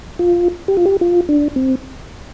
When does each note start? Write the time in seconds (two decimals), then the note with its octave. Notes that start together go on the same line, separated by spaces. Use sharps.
0.19 F4
0.68 G4
0.77 F4
0.86 G4
1.01 F4
1.29 D4
1.56 C4